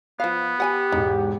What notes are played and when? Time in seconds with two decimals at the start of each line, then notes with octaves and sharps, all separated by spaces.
0.20 F3 B3 F5
0.60 G4 F#5 G#5 B5
0.92 E1 G#2 D#4